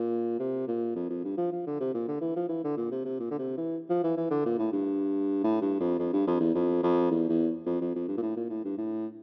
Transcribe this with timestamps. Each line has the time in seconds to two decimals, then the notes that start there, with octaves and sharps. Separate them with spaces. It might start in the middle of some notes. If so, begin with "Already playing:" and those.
Already playing: A#2
0.39 C3
0.68 A#2
0.95 F2
1.10 F2
1.24 G2
1.37 F3
1.52 F3
1.66 D3
1.80 C3
1.94 A#2
2.08 D3
2.21 E3
2.36 F3
2.49 E3
2.64 D3
2.77 A#2
2.91 C3
3.05 C3
3.20 A#2
3.31 D3
3.38 C3
3.57 E3
3.89 F3
4.03 E3
4.17 E3
4.31 D3
4.45 A#2
4.58 A2
4.72 G2
5.43 A2
5.62 G2
5.80 F2
5.99 F2
6.13 G2
6.27 F2
6.40 E2
6.55 F2
6.83 F2
7.11 E2
7.29 E2
7.66 F2
7.81 F2
7.95 F2
8.08 G2
8.17 A#2
8.22 A2
8.37 A#2
8.50 A2
8.65 G2
8.78 A2